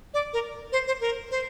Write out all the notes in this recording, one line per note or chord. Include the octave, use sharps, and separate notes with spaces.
D5
A#4
C5
C5
A#4
C5